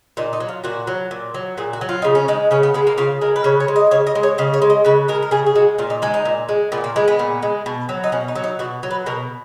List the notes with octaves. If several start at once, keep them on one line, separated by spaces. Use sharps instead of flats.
A#2 D#4
D#4
F#3
F4
A#2 F#4
F#3
A#2
F#3
A#2 G#4
F#4
F#3
F4
C#3 D#4
C#4
G#3 D#4
C#3 C#4
B3
G#3 B3
A#3
C#3 F4
G#3 A#4
B4
C#3 C#5
C#5
G#3
D#5
C#3 C#5
D#5
G#3
C#5
C#3 D#5
C#5
G#3
D#5
C#3 B4
G#3 A#4
A#4
C#3 G#4
G#4
G#3 F#4
A#2 F4
D#4
G#3 D#4
D#4
A#2
G#3
A#2 B3
A#3
G#3 B3
B3
A#2
G#3
B2
F#3
D#4
B2 C#4
D#4
F#3
D#4
B2 F#4
F#3
B4
B2 A#4